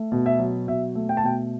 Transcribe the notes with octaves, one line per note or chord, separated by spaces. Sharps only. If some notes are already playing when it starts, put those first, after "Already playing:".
Already playing: A3
B2
E5
F#3
B2 E5
A3
G5
A5
B2 G5